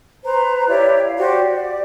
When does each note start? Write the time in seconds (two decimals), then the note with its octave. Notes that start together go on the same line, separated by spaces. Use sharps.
0.23 B4 C5 A#5
0.67 E4 G4 C#5 D5
1.05 F5
1.17 F#4 G4 C5 D5
1.52 D5